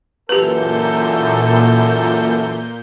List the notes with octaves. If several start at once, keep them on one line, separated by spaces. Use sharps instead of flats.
F#2 A#2 E3 G4 A4 B4 G6